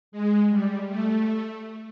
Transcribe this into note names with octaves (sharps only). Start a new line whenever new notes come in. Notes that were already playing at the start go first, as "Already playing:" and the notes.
G#3
G3
A3